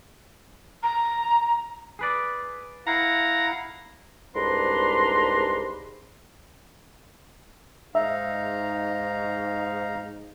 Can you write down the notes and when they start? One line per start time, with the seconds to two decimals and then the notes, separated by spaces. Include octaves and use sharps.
0.83 A#5
1.99 G#4 B4 D5
2.87 E4 F5 F#5 A#5
4.36 C2 G#2 D4 B4 A#5 C6
7.95 G#2 D#4 E5 F5 A#5